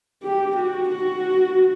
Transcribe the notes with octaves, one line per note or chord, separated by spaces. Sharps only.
G4
F#4
F#4